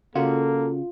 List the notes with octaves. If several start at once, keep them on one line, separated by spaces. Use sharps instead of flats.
C#3 A#3 F4 F#4 A4